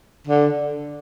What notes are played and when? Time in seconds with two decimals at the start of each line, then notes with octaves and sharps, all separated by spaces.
0.27 D3